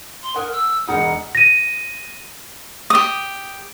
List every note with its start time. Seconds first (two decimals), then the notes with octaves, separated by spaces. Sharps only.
0.23 C6
0.36 A#4 F#5 D#6
0.52 E6
0.88 E1 D#4 F#5 D#6
1.35 A#6 D#7
2.90 G4 D#6